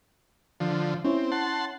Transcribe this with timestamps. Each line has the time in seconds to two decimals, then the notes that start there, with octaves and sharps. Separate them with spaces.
0.60 D3 F3
1.05 C4 C#4 E4 C#5
1.32 F#5 A5 C6